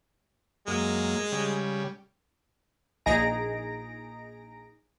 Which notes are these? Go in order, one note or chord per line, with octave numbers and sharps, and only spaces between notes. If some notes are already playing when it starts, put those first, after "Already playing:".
F#2 G#3 A#3
C#3 G3
A#1 D#4 G#4 A#5 A#6 D7